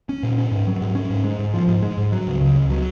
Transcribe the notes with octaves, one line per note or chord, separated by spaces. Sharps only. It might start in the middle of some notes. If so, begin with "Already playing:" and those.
C#4
A#2
C#4
G#2
F#3
G#2
C#4
G#2
G#3
G#2
F3
G#2
G#3
G#2
F#3
C#2
C#3
C#2
F#3